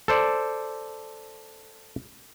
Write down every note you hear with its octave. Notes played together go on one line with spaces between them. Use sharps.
A4 C5 D5